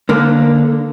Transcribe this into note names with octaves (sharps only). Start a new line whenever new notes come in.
D3 A#3